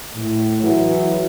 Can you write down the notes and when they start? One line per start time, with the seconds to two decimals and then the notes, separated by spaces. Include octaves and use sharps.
0.14 A2
0.62 E3 F#3 E4 F#4 G#4